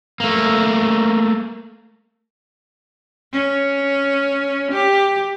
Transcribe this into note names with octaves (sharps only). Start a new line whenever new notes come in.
A3 A#3
C#4
G4